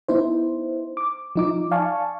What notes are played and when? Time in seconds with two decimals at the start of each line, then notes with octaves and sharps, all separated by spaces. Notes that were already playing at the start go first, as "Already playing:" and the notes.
0.08 B3 D#4 E4 C5
0.97 D6
1.36 F3 D#4 D6
1.71 D5 F5 G#5 A5 C#6